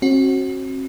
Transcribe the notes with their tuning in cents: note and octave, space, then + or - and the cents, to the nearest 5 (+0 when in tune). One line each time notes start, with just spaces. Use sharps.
C4 +45 F#4 +0